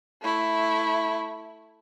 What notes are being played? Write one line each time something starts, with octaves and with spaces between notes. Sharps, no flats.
A3 E4